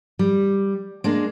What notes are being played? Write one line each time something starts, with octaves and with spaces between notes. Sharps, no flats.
G3
G#3 A#3 D4